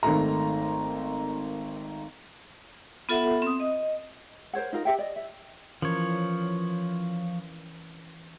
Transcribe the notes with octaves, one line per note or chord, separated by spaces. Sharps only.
G#1 D#3 A3 A#5
B3 F4 A4 E5 F#5
C4 D#6
D#5
A#4 C5 C#5 F#5
D#4 F4 A#4
G4 E5 G5
D5 D#5
E5
E3 F3 C#4 A#4 C#5